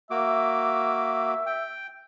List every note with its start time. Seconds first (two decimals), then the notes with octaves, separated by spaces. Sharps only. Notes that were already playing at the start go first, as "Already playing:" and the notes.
0.11 A#3 F#4 E5 D6
1.46 G5